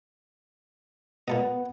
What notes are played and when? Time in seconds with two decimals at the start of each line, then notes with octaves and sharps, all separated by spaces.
1.28 A#2 B3 A4 D#5